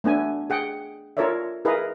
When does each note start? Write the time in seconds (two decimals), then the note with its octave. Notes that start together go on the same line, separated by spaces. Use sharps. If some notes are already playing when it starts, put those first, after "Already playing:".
0.04 A3 B3 D4 G#5
0.50 G#4 F#5 G5
1.17 F4 A4 A#4 C#5 D5 E5
1.65 E4 G#4 A#4 B4 D#5 F5